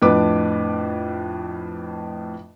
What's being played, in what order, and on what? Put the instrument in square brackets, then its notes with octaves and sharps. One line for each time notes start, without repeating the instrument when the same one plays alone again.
[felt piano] F2 A2 D4 B4 D6